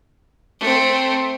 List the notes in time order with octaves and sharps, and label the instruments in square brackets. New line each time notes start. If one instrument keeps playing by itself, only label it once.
[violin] A3 C4